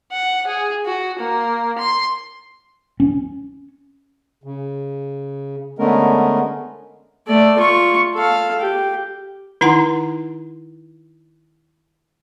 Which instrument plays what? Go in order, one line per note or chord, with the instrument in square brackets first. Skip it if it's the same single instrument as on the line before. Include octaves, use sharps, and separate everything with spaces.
[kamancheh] F#5
G#4
F#4
A#3
C6
[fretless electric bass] C#4
[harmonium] C#3
D3 G#3 A3 B3 C#4 A#4
[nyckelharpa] A3 D5
F4 C#6
A4 F5
G4
[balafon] D#3 D#4 E4 F#5 A#5 C6